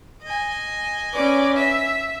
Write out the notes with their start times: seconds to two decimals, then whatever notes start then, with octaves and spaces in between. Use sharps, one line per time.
0.23 D#5 G#5
1.13 C#4 B4 D5
1.57 E5